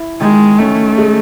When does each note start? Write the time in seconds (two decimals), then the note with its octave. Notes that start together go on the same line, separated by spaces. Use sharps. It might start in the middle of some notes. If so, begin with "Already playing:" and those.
Already playing: E4
0.21 D#3 G#3
0.59 A3 C#4
0.98 G#3